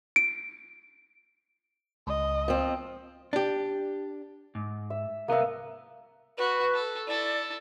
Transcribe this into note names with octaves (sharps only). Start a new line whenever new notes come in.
D7
C#2 D#5
F3 C4
D4 G4
G#2
E5
C2 A#3 B3 A#4 E5
F#4 B4
A4
E4 A4 D5